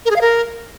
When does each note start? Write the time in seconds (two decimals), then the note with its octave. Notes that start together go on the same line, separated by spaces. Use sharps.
0.05 A#4
0.11 G#4
0.16 F5
0.21 A#4